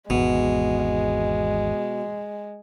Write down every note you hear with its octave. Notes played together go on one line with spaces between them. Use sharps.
G#1 E2 B2 G#3